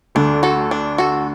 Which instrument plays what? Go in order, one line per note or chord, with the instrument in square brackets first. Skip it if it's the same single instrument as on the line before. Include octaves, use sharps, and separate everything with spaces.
[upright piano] D2 D3 [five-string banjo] D4
[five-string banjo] F#4 A4
D4
F#4 A4